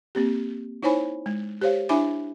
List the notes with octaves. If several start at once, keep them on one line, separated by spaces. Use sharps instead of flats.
A#3 C4 G4
D#4 E4 C5 C#5 G#5 B5
G#3
G4 C5 C#5 F5
D4 E4 E5 G#5 B5 D6